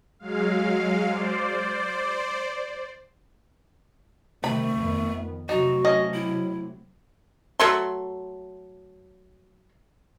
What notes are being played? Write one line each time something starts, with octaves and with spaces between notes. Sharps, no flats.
F#3 G#3 F5
C5 D5
C3 D#3 G3 A3 B5
F2 D#3 B3
C3 F#3 A3 D#4 F#4
C#4 D#5
E4
F#3 A3 C6